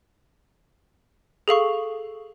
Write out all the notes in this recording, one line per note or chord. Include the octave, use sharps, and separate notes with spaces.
G#4 A4 F5 C#6